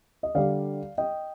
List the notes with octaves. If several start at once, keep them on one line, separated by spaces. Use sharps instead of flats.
D#5
D3 G3 D5 F5
D#5 G5